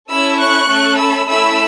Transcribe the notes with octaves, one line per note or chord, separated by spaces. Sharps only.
C#4 E4 A4 B5 E6
C#6 F#6
A3 C#4 A4
B5 E6
A3 C#4 E4 A4 B5 E6